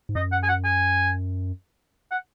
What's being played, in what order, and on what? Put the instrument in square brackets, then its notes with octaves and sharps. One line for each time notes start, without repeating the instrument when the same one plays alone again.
[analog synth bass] G#2
[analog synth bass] F#2 [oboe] D#5
[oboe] F#5
G#5
F#5
G#5
F#5